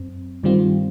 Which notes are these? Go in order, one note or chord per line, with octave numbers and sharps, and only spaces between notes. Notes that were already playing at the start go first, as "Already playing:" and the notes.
Already playing: F#2 C4
G2 D#3 G3 C4 F4